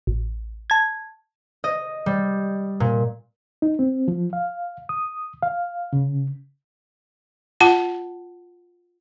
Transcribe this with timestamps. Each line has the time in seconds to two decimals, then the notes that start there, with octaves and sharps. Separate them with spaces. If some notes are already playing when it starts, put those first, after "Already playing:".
0.07 A1
0.70 A5 G#6
1.64 D#5
2.06 G3
2.80 A#2
3.62 D#4
3.79 C4
4.08 F3
4.33 F5
4.89 D#6
5.43 F5
5.93 C#3
7.61 F4 F#5 A5